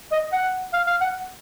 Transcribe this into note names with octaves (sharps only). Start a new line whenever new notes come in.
D#5
F#5
F5
F5
F#5